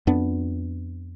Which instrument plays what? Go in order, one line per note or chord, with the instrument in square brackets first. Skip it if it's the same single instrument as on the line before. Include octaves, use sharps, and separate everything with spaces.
[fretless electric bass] F2 B3 D4